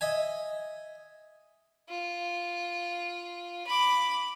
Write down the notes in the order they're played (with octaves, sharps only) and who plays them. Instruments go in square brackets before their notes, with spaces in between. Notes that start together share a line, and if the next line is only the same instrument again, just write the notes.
[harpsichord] D#5 E5 G#5
[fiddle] F4
B5 D6